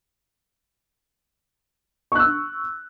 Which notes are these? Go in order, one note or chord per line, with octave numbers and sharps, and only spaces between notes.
C#6 E6 F#6